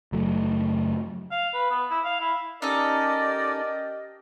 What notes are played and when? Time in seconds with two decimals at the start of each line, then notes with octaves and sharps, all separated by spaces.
0.12 F#1 F#3 A3
1.31 F5
1.54 B4
1.70 B3
1.90 E4
2.04 F5
2.20 E4
2.62 C#4 D#4 G4 A4 A#4 D5 D#5